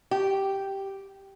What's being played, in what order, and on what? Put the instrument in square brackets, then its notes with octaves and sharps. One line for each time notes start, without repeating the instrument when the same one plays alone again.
[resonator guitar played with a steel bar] G4